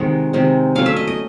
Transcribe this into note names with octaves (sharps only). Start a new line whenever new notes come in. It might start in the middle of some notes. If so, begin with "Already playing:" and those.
Already playing: C3 D#3 G#3 F#5
C3 D#3 G#3
F#3 A3 C#4 F5
E5
D#5
D#5